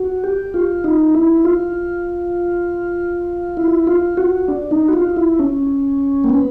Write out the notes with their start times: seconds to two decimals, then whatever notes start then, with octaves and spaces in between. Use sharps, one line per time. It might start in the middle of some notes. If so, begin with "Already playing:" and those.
Already playing: F#4
0.24 G4
0.54 F4
0.84 D#4
1.15 E4
1.45 F4
3.57 E4
3.87 F4
4.17 F#4
4.48 D4
4.71 D#4
4.88 F#4
4.93 F4
5.16 E4
5.39 C#4
6.24 A#3
6.30 B3